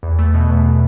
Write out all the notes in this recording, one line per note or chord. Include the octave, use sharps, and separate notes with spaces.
E2
A3
B2
E2